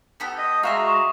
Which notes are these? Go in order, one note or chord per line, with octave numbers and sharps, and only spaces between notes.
B3 G4 A4
D#5
G#3 F4 F#4 E5 A#5 C6 D#6
C#6 E7